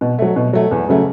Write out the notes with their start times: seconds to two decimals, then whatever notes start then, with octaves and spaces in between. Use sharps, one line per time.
0.01 B2
0.19 F#3 A3
0.36 B2
0.53 F#3 A3
0.71 E2
0.89 C#3 F#3 A3